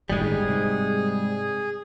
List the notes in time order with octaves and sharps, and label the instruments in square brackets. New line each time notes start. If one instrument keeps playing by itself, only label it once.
[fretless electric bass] G1 A2 D#3 [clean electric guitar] G3 G#3 [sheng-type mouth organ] G#4
[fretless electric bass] G#2 C3